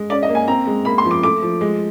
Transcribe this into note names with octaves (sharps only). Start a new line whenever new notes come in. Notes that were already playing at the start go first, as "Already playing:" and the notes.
Already playing: G#3
C#4 D5
D#5
A#3
G#5
C4 A#5
G#3
A#3 B5
C6
F3
D6
A3 D6
F3
G#3